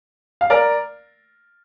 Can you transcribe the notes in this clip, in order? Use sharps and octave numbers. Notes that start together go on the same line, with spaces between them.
F5
A#4 D5